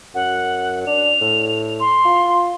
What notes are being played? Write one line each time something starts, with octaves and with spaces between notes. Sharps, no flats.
F#2 F#5
D4 F7
A2
C6
F4